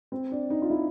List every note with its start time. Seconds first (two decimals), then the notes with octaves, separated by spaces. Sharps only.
0.12 C4
0.32 D4
0.50 D#4
0.62 F4
0.70 E4